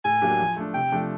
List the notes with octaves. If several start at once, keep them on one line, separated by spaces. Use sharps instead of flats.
A2 G#5
F#3 A#3 D4 G4
F3
A3 D4
C3 G5
F3 A3 D4